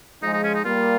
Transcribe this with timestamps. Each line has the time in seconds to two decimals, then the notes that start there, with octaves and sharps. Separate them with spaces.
0.21 F3 G#3 D#4
0.33 D#4
0.43 C#4
0.54 D#4
0.64 G3 A#3 F4